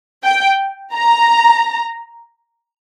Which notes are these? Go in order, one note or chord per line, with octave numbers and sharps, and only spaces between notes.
G5
A#5